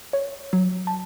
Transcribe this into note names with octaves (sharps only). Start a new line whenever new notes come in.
C#5
F#3
A5